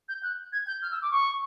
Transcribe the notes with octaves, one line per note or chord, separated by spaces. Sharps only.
G6
F#6
G#6
G6
F6
E6
D6
C#6